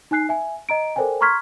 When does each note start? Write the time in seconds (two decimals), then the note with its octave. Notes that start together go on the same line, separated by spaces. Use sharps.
0.11 D#4 G#5 F#6 C7
0.29 E5 G#5
0.69 D#5 A#5 D7
0.96 A4 A#4 C5 D5 G5 G#5
1.21 A#5 C6 C#6 F6 G#6 B6